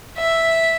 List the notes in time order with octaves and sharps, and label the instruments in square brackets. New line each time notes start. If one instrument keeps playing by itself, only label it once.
[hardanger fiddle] E5